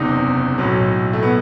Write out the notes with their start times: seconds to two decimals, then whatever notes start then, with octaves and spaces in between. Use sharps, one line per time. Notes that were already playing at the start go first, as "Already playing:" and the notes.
Already playing: F#1 E2 C3 D#4
0.58 B1 A2 F#3
1.13 A3
1.23 B3